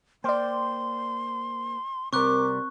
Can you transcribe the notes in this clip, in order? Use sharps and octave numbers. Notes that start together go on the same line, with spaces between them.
A#3 C5 D5 G5 C6
C3 G3 C4 A#4 C#6 D6 F#6